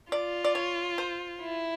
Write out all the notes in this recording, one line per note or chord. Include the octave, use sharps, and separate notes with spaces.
F4 D5
D5
C#5
C5
E4